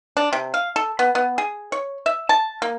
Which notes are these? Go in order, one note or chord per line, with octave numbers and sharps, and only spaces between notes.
D4
C3
F5
A4
B3
B3
G#4
C#5
E5
A5
A#3